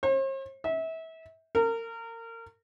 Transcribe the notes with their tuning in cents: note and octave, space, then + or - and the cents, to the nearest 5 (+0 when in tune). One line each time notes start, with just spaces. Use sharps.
C5 +45
E5 -30
A#4 -30